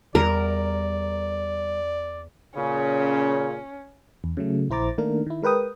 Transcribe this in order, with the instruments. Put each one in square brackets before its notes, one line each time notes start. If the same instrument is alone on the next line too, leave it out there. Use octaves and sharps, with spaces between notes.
[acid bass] E2 [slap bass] G3 [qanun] A#4 [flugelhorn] D5
[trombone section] A#2 C#3 [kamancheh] C#4
[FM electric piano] E2
C#3 F#3 A3
A#1 E4 C5 A#5 D6 A6
D#3 A3 A#3 D4 A#4
D#3 E4
G#3 A#4 B4 G5 D#6